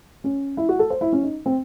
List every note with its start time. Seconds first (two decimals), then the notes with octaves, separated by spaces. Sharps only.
0.24 C#4
0.57 E4
0.69 F#4
0.79 A4
0.90 C5
1.01 E4
1.12 C#4
1.23 D#4
1.46 C4